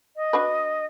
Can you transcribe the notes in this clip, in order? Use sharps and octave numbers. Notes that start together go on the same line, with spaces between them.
D#5
D4 F#4 B4